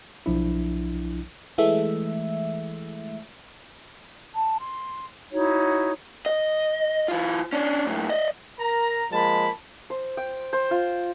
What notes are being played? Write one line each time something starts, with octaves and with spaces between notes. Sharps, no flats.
B1 F3 D4 E4
E3 G#3 A3 E5
A5
C6
D#4 E4 F#4 C#5
D#5
E3 F4
C#4 D4
F#2 A2
D5 D#5
A#4 A#5
F3 G#3 A#3 A5 B5
C5
G5
C5
F4